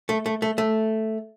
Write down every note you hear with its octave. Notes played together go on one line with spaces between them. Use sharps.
A3
A3
A3
A3